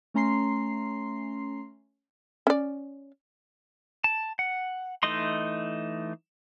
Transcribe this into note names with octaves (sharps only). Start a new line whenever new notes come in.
A3 C#4 A#5 C6 C7
C#4 D5
A5
F#5
E3 A3 D#4 D#5 C6